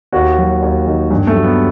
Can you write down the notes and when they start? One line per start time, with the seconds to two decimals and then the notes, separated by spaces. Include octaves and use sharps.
0.12 D#2 F#4
0.38 F#3
0.62 D#2
0.87 D#3
1.11 G2
1.27 A3
1.35 F#3
1.43 B3